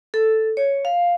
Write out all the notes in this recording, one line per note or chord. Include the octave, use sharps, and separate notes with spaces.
A4
C#5
F5